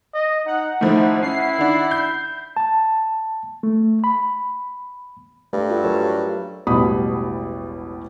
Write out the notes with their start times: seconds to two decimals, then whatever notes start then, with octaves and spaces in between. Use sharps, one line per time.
0.14 D#5
0.46 D#4 F#5
0.81 G#2 D#3 F3 A3 E4
1.23 C#4 E4 C7
1.58 D#3 D4
1.91 G6
2.57 A5
3.63 A3
4.04 B5
5.53 G2 A3
5.69 F4 F#4 A4
5.84 F#3 A#4 C#5
6.67 E1 A1 B2 G3 B5 D#6